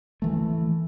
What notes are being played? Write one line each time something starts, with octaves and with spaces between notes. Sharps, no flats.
E3 A3